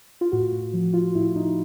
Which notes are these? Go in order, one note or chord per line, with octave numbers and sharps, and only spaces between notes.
F4
A2 F#4
A2
F3
F3 F4
A2 E4
A2 D#4